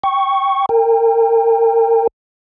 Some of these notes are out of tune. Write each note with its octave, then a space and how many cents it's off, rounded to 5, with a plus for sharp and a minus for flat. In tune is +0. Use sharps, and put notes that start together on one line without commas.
G5 +0 C#6 +0
A#4 -35 G5 +35